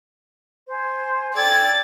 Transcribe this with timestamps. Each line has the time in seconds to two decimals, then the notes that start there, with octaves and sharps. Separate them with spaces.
0.68 C5 G#5
1.34 A4 D5 G5 G#6 A6